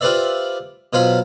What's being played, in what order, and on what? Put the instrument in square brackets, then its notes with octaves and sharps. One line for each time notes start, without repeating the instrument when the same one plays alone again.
[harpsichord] F4 G4 B4 C5 D5 E5
B2 F#3 F4 C5 F5 B5